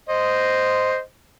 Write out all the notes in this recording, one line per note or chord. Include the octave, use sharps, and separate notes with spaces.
C5 D#5